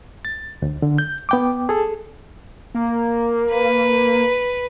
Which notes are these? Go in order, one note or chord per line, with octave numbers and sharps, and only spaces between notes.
A6
D2
D3
G6
B3 G5 D6
G#4 A4
A#3
B4